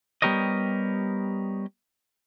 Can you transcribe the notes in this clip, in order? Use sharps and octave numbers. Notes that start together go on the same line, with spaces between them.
G3 B3 G4 A#4 C#5 D#5